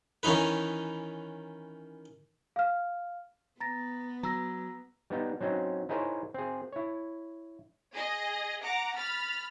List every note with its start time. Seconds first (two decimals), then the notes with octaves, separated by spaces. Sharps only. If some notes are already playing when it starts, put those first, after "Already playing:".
0.23 D#3 E3 C#4 D#4 B4
2.56 F5 F6
3.60 B3 A#5 A6 A#6
4.23 F#3 A#5 E6 A#6
5.10 G3 B3 D#4
5.41 F#3 C4 C#4 D#4
5.89 D#4 E4 G#4 A#4 C5 C#5
6.34 C4 G#4
6.73 E4 C#5
7.92 G#4 D#5
8.63 F#5 A#5 D6
8.96 B5 F6 A6